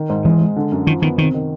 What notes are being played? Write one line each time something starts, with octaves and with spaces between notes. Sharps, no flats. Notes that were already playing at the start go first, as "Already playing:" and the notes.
Already playing: D#3
G#2
E3 G#3
G#3
D3
F#2
D#3 F3
D#3 B3
C3 D#3
D#3